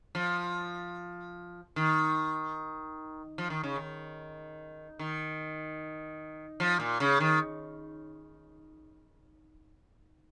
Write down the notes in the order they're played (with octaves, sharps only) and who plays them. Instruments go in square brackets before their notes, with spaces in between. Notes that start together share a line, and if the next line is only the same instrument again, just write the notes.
[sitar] F3
D#3
F3
D#3
C#3
D#3
D#3
F3
A#2
C#3
D#3